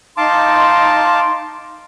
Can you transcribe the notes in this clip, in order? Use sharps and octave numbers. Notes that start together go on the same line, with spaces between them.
D#4 F5 A5 C6 D6